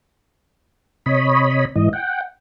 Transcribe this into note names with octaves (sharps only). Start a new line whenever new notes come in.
C3 C#5 D#5 B5
G#2 E3 D#5
F#5 G5